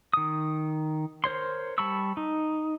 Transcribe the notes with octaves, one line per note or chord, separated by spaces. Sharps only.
D#3 D#6
A#4 C5 C#5 C6
G3 A5 B5 C#6 E6
D#4